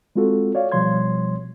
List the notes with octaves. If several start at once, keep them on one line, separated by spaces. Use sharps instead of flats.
G#3 C4 F4 F#4 A4
C#5 D5 F5
B2 F3 G3 C#5 C6 G#6